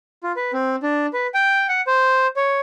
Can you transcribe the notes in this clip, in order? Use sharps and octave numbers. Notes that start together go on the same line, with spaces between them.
F4
B4
C4
D4
B4
G5
F#5
C5
C#5